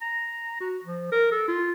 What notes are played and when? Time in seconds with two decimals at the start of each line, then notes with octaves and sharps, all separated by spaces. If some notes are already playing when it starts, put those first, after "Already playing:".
0.01 A#5
0.60 F#4
0.84 F3
1.12 A#4
1.32 A4
1.48 F4